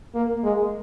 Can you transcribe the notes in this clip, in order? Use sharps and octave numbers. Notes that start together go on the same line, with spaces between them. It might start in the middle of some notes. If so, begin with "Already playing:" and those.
A#3
G#3